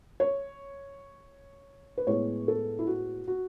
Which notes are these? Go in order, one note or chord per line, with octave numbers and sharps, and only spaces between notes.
C#5
B4
A2 G#3 B3 C#5
A4
E4
F#4
F#4